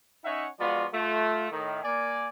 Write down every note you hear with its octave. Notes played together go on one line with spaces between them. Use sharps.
C#4 D#4 C#5 E5 F#5
F3 G#3 B3 F4 F#4 D5
A3 F4
A2 D#3
A#3 D5 G#5